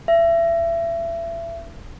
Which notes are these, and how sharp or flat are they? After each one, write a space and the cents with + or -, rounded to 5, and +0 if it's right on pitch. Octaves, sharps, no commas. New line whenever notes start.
E5 +30